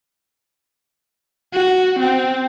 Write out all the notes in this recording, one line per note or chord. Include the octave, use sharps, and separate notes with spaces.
F#4
C4